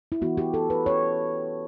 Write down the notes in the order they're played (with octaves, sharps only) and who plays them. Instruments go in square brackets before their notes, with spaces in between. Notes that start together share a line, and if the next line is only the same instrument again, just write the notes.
[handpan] E4
E3 B3 F#4
G4
A4
B4
C#5